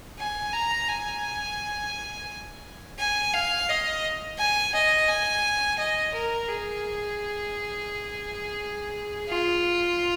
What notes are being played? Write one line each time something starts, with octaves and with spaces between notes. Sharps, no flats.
G#5
A#5
G#5
G#5
F5
D#5
G#5
D#5
G#5
D#5
A#4
G#4
F4